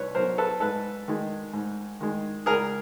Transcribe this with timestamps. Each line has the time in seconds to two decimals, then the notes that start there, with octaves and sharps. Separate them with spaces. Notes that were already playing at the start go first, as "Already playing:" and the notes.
Already playing: C2 B4 C#5
0.15 B2 F#3 A#4 C5
0.38 A4 B4
0.60 G#2 A4 B4
1.08 D#3 G#3
1.53 G#2
2.01 D#3 G#3
2.46 C#2 G#4 A#4